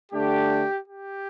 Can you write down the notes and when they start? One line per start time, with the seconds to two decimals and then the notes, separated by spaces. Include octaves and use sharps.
0.12 D3 A3 D4 G4
0.88 G4